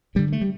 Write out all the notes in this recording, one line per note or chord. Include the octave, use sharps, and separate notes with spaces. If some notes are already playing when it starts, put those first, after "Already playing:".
G2 D3 G3
A3
G3